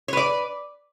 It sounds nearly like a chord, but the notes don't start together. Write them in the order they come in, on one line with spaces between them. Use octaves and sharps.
C#5 B4 D5